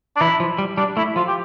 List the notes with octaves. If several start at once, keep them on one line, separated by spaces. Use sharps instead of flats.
D4
E3 E4
F3
G3
G3 D4
A3 E4
F3 F4
G4